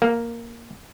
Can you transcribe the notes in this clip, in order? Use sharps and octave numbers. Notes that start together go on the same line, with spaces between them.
A#3